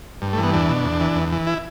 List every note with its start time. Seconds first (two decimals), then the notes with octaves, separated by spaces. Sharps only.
0.22 G2
0.33 A3
0.38 E3
0.43 B3
0.53 E2 D4
0.69 B2
0.84 E2
1.01 E3
1.16 E2
1.32 E3
1.47 E4